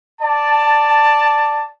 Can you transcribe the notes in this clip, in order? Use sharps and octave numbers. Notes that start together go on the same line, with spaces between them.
D5 A5